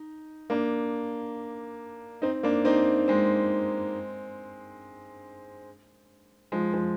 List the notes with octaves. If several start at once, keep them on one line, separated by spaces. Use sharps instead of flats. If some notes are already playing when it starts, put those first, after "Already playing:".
Already playing: D#4
A#3 D4
C4 D#4
A#3 D4
C4 D#4
G#3 C4
F3 G#3
F3 G#3